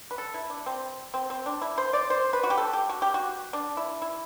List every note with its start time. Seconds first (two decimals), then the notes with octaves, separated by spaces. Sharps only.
0.11 B4
0.18 A4
0.34 E4
0.50 D4
0.66 C4
1.14 C4
1.30 C4
1.46 D4
1.62 E4
1.78 C5
1.93 D5
2.10 C5
2.33 B4
2.44 F#4
2.50 G4
2.58 A4
2.73 G4
2.89 F#4
3.02 G4
3.14 F#4
3.53 D4
3.77 E4
4.02 E4